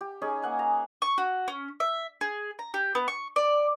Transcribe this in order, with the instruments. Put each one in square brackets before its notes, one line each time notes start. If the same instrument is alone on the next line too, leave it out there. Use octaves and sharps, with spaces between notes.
[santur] G4
C#4 D#4 G#4
A#3 F#5 G#5
A#5
[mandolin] C#6
F#4
C#4
E5
G#4
A#5
G4
B3
C#6
D5